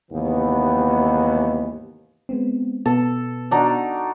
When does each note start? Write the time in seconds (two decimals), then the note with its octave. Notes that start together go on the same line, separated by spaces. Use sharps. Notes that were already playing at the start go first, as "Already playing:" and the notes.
0.12 D#2 G#2 C3 D#3 E3 B3
2.29 G#3 B3 C4
2.86 B2 B3 A4
3.51 D4 D#4 F#4